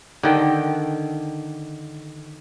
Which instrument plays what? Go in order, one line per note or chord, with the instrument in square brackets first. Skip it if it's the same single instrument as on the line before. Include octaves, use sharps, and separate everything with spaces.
[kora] D3 D#3 G5